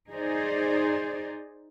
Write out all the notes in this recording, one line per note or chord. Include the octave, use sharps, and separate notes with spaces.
D#4 G#4 C5 D5